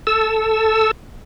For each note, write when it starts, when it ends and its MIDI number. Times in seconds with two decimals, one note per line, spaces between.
0.07 0.91 69
0.07 0.91 88